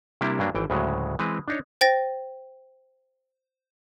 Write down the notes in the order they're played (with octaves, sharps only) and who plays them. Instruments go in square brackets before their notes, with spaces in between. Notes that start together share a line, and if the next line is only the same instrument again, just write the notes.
[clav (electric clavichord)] C3 G3 A#3 D4 E4 G4
G2 F#3 A#3 D4
G#1 E3 G5
D2 A2 C#3 F#3 G#3
E3 G#3 C4 B4
D4 D#4 C#5
[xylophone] C5 G5 A6 A#6